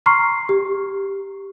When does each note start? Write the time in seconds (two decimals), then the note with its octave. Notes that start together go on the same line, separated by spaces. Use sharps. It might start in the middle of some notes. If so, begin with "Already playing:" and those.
0.06 A#5 C6 C#6 F6 C7
0.49 G4